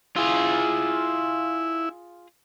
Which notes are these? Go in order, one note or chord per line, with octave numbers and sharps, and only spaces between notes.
E4 F4 G#4